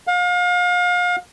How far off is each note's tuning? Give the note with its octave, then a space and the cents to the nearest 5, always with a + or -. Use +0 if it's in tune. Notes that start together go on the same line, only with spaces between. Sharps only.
F5 +35